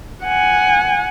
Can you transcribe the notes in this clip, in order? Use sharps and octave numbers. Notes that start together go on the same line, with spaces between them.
F#5 G#5